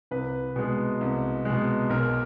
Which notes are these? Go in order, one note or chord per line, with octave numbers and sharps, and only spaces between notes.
C2 B4
B2 G#3
C2
B2 G#3
B1 A#4